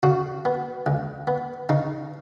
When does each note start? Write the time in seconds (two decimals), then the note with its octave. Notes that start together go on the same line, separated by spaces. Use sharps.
0.03 C#3 F#4
0.45 B3
0.86 C#2
1.27 B3
1.69 C#3 D#4